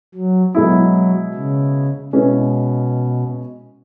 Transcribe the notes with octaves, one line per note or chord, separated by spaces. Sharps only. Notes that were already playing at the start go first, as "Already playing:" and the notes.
F#3
B2 F#3 G#3 E4
C#3
B2 G#3 C#4 E4 B4